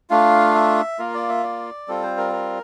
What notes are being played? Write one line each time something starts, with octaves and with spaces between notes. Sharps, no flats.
A3 D4 F4 F5
E5
A#3 F4 A#4
D5
E5
D5
G3 C4 F4 A4
C5
A#4
A#4